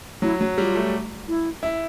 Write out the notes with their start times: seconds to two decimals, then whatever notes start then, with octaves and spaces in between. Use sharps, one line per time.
0.22 F#3 E4
0.41 F#3
0.58 G3 F4
0.76 A3
1.28 E4
1.63 E4